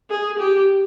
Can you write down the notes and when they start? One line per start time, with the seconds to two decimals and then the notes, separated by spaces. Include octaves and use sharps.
0.10 G#4
0.39 G4